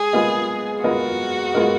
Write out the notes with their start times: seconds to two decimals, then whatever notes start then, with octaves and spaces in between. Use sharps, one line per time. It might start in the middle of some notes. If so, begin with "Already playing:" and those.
Already playing: G#3 G#4
0.13 G#3 B3 F4 A#4 D#5
0.83 G#3 B3 F4 F#4 A#4 D#5
1.54 G#3 B3 F4 A#4 D#5